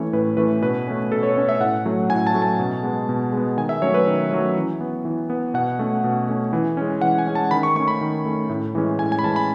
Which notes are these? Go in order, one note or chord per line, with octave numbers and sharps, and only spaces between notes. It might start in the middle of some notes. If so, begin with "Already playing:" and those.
Already playing: E3 A3 C#4 C#5
A2 B4
E3 A3 C#4 B4
B2 B4
A3 C#4
B2 A4
C#5
A3 C#4
E5
A2 F#5
F#3 A3 C#4
A2 G#5
A5
F#3 A3 C#4
A5
B2
G#3 B3
B2
G#3 B3
D#3 G#5
E5
F#3 A3 C#4 C#5
B4
D#3
F#3 A3 C#4
E3
B3
E3
B3
B2 F#5
A3 C#4
B2
A3 C#4
E3
G#3 C#4
E3 F#5
G#5
G#3 C#4
A5
D#3 B5
C#6
A3 C#4 C#6
B5
D#3
A3 C#4
A2
E3 G#3 C#4
A2 G#5
G#5
B5
E3 G#3 C#4 A5
B5